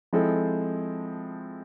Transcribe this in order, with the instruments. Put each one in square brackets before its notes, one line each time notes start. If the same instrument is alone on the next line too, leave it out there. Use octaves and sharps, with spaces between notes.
[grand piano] F3 G#3 C4 E4 A4